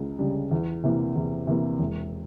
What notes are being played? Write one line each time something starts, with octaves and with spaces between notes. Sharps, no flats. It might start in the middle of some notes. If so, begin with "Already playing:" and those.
Already playing: C#2 C#3
C#3 G3
E2
C3 E3 A#3
E2
C3 E3 A#3
E1